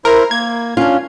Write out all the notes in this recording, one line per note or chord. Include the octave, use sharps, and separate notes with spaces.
E4 A#4 C5
A#3 G#6
C#4 D4 F4